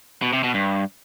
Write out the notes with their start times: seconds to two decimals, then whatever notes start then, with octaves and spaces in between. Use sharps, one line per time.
0.22 B2
0.33 C3
0.44 B2
0.54 G2